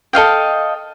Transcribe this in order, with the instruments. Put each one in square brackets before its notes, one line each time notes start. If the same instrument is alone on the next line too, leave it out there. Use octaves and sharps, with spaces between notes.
[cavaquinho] A4 D#5 F5 G5